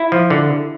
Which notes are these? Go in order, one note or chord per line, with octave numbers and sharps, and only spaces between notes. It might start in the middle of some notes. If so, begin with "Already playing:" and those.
Already playing: E4
F3
D3